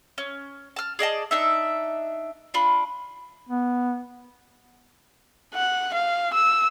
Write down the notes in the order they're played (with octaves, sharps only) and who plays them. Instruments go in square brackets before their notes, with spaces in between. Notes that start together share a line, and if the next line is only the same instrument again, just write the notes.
[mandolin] C#4
A5 F6
G#4 D5 D#5 A5
D4 D#4 E5
D4 F4 B5
[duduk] B3
[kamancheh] F#5
F5
E6